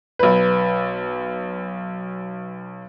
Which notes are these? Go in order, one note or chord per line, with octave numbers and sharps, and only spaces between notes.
B1 B4